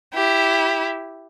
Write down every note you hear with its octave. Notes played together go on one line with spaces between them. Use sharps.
E4 G4